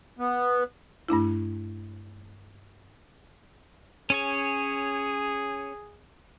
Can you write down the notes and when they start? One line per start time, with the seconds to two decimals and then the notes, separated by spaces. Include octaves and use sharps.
0.19 B3
1.09 G2 A3 D4 E4
4.10 C#4 G#4 C#5 G#5